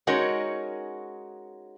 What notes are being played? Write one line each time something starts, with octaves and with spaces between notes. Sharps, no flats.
G#3 C#4 D#4 F#4 A#4 C#5